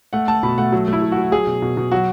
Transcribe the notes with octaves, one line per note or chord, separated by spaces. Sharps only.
A3 F#5
A3 A5
B2 B5
A3 F#5
F#3
A3 E4
F#3
F#4
F#3
F#3 G#4
B2
B2
B2
F#3 F#4